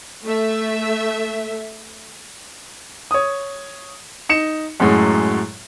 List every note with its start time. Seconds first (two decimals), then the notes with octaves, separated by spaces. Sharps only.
0.24 A3 E5
3.11 C#5 D#6
4.29 D#4 C#7 E7
4.80 F#2 A2 F#3 G#3